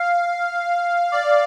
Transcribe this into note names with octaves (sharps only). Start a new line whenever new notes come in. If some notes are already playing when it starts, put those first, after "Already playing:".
Already playing: F5
D5